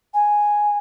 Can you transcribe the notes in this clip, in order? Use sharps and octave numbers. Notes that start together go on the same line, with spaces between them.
G#5